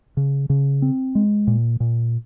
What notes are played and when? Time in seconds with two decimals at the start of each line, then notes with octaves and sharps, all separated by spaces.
0.17 C#3
0.50 C#3
0.82 C4
1.15 G#3
1.47 A#2
1.80 A#2